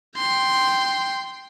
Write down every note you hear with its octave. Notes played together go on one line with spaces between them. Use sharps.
G5 C6